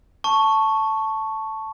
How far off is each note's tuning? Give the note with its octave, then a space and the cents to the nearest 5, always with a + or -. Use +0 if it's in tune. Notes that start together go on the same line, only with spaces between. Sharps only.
A5 +0 C#6 +0